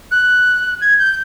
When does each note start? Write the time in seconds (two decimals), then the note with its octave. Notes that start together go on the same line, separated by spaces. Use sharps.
0.11 F#6
0.81 G#6
0.98 G6